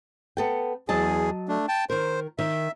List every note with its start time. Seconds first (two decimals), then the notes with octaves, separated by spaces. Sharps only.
0.37 B3 A4 G5
0.89 E2 F#3 G#4 D#5 A5
1.48 A3 D4
1.68 G5 A5
1.90 D#3 A#4 C5
2.39 D#3 E5